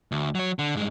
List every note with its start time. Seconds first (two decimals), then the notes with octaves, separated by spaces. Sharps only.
0.12 D2
0.35 F#3 C#5
0.59 D3
0.75 G2 G#3